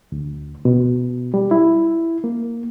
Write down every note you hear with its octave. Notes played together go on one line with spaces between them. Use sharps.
D2
B2
G3
E4
A#3